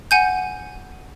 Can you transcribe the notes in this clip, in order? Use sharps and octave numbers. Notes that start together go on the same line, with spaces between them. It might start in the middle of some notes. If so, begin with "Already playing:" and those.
F#5 G#5 G6